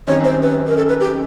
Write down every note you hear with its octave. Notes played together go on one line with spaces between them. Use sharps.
F#2 D#3 G3 C4 C#5
C5
B4
A#4
A4
B4
G4